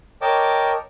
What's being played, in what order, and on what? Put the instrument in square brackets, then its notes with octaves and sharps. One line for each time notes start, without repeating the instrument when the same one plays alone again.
[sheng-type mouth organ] A#4 C#5 D#5 G5 A5 D6